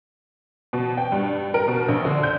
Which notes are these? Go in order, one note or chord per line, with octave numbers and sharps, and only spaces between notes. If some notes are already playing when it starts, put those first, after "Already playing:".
B2
G5
G2
A#4
B2
A#1
D3
G6